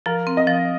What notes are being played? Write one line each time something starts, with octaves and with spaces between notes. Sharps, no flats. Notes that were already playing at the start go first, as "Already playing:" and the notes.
F3 A#4
C4
D#5
F3